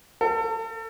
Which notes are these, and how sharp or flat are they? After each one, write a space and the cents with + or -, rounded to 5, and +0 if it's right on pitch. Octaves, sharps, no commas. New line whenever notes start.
A4 +35